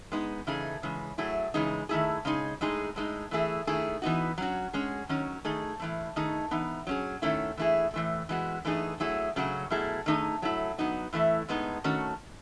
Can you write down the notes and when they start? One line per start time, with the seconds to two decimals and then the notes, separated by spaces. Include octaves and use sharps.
0.12 G#3 B3 D#4
0.47 C#3 E3 A3 D#4 G#4
0.83 C#3 E3 G#3
1.18 F#3 A3 E4 G#4
1.54 C#3 E3 G#3 D#4
1.89 D#3 A3 E4 G#4
2.25 C#3 G#3 D#4 G#4
2.61 A2 G#3 D#4 G#4
2.96 A2 G#3 D#4
3.31 E3 A3 E4 G#4
3.67 D#3 A3 E4 G#4
4.02 E3 B3 D#4 F#4
4.38 F#3 C#4 F#4
4.73 G#3 C#4 G#4
5.09 D#3 F#3 C#4
5.45 D#3 A3 D#4 G#4
5.80 A2 E3 A3
6.16 D#3 A3 D#4 G#4
6.51 E3 B3 D#4
6.87 F#3 C#4 G#4
7.22 D#3 A3 C#4 E4
7.57 E3 A3 E4 G#4
7.94 A2 E3 A3
8.29 E3 G#3 B3 F#4
8.65 E3 A3 D#4 G#4
9.00 F#3 A3 E4 G#4
9.36 C#3 F#3 A3 C#4 F#4
9.70 B2 F#3 A3 E4 G#4
10.06 D#3 A3 D#4 G#4
10.42 F#3 A3 E4
10.78 F#3 B3 D#4 F#4
11.13 A2 E3 A3 E4
11.49 A2 G#3 B3 D#4
11.84 D#3 A3 C#4 F#4